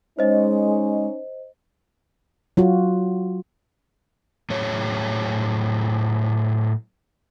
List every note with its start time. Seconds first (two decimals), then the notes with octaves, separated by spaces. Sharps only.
0.19 G#3 C#4 D#4 C5 D#5
2.57 F#3 F4 F#4
4.50 A2 F#3 G#4 C#5